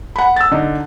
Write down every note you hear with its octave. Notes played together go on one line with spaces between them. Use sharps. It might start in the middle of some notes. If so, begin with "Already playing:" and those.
F#5 B5
E6 A6
D3 D#4